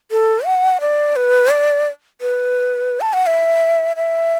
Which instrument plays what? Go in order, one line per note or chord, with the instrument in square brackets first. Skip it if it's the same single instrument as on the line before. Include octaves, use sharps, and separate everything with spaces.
[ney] A4
F#5
D5
B4
D5
B4
A5
F#5
E5
E5